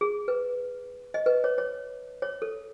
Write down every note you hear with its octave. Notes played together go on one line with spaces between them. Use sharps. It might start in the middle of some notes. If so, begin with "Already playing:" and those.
G#4
B4
D#5
B4
C#5
C#5
C#5
A4